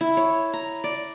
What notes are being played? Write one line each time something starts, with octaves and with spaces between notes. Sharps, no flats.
E4
C#5
A#5
D5